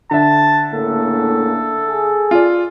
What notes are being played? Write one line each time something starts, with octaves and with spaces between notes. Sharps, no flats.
D3 E5 A5
A2 C#3 A#3 A4
G#4
F4 D5